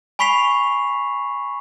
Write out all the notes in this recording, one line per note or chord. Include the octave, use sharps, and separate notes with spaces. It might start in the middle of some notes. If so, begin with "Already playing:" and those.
G#5 B5 C#6 B6 C7 F7